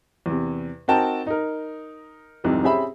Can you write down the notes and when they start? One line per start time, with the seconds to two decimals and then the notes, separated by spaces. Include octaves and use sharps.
0.26 E2 C3
0.88 C4 D#4 F#4 A#4 G5 A5
1.27 D#4 A#4
2.44 F1 C2 G#2 C3
2.63 C4 C#4 G4 G#4 E5 B5